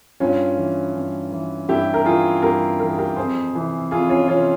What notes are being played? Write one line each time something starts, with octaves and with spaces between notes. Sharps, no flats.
G2 C#4 F4
E3
G2
E3
G2 E4 G4
A#4
E3 F4 G#4
G2 G4 A#4
E3 A#4
G#4
G4 A#4
F2 G#4 C5
C3 E3
F2 F4 G#4
C#4 F4
C3 E3 C#4 F4